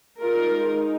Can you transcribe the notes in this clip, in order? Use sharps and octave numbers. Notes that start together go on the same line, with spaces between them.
G#3 D#4 F4 A#4